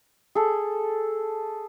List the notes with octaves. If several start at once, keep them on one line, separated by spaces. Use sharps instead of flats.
G#4 A4